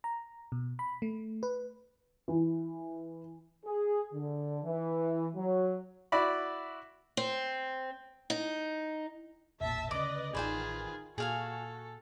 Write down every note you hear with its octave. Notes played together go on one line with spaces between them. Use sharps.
A#5
B2
B5
A3
B4
E3
G#4
D3
E3
F#3
E4 F#4 D5 B5
C4
D#4
E1 A1 A#2 E5 A5
D2 C#3 B4 D5 D#5 D6
A1 D#3 F4 G#4 B4 C5 G#5
A#2 F#4 G#4 A4 F5 G#5